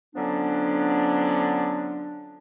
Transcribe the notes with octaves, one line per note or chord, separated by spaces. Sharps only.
D3 F3 F#3 B3 C#4 D4